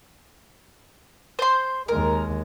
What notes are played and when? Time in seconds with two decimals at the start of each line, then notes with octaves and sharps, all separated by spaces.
1.39 C5 C6
1.88 D#2 G#3 A#4